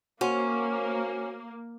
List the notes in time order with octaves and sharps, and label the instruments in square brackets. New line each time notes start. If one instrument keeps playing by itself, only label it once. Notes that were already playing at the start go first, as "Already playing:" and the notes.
[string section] A#3 [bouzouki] C#4 [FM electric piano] F#4 C5 C#5